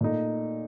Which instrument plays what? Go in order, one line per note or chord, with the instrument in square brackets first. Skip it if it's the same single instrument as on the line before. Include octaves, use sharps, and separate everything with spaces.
[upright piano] A#2 A3 D#4